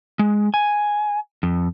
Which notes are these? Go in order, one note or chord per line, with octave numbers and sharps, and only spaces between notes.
G#3
G#5
F2